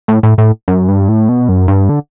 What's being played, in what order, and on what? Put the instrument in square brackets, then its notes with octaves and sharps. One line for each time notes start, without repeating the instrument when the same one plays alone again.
[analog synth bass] A2
A2
A2
F#2
G2
A2
B2
F#2
G2
D3